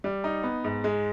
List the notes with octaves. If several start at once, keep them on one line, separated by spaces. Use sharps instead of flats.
G3
D#4
B3
G#2
G#3